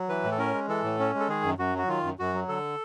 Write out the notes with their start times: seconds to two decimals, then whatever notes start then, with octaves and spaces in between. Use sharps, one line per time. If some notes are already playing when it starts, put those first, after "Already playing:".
Already playing: F#3
0.09 E3 B4
0.24 A2
0.31 A4
0.38 C#4 A#4
0.54 G#3
0.68 E3 A4
0.83 A2
0.99 C#4
1.14 G#3
1.20 A4
1.28 D#3 G#4
1.44 F#2
1.58 F#2 F#4
1.74 F#3 F#4
1.88 D#3 F4
2.03 F#2
2.19 F#2 F#4
2.34 F#3
2.48 D3 A4